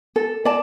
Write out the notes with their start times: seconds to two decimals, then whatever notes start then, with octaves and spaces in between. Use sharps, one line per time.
0.16 A4
0.45 D5 A5